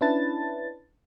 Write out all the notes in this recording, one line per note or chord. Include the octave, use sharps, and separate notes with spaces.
C#4 D4 E4 B4 A5 A6